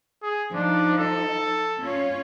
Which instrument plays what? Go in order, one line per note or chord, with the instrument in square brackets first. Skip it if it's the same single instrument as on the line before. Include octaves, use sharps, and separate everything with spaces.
[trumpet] G#4
[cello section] F3 D#4 [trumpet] D4
[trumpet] A4
[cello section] C#4 F4 C#5